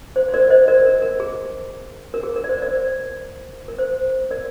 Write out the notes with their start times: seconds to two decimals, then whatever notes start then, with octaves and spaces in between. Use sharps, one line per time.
0.16 C5
0.29 C5
0.34 A#4 D5
0.50 C5 D#5
0.68 A#4 D5
0.85 A#4
1.02 A#4
1.20 G#4
2.14 A#4
2.23 G#4
2.36 A#4
2.44 D5
2.49 C5
2.62 A#4 D5
3.68 A#4
3.79 C5
4.31 A#4 D5